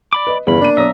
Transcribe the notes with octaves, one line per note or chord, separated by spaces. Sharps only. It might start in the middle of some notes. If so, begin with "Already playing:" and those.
D5 B5 D6
B4 D#5
G1 E2 C#3 E3 B5
A#3 D4 D#7
B1 C#5 E5 A#5 D#6